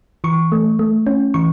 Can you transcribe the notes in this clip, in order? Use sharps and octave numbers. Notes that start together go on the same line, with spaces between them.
E3 C#6
A3
A3
C#4
E3 C#6